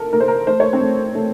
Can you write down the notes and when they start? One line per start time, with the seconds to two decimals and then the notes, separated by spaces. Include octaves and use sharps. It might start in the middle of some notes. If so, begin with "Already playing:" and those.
Already playing: A#3 A4 A#4
0.13 A#3 A#4
0.20 C5
0.28 A#4
0.47 A3 C5
0.60 C#5
0.73 C4 C5
0.81 A3
1.15 A3